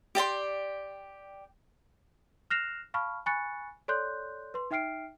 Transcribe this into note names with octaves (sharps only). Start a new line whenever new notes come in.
G4 D5 G5 C6
F6 F#6 A#6 C7 E7 F7
F5 A5 B5 C#6 F6
G#5 B5 C#6 F#6 A6 C#7
A4 C#5 D5 C6 F#6 G6
B4 C6
D#4 E5 G5 F6 C7 D7